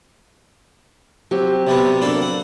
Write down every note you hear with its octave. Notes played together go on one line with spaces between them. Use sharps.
F#3 C4 G4
C3 G3 B3
A#3 D4 A4
F#5